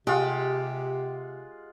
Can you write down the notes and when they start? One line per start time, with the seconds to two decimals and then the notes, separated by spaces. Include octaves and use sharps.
0.07 C3 G#3 F4 G4 F#5